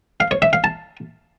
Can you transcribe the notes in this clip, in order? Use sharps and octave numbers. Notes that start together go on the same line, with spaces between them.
F5
C#5
E5
F5
A5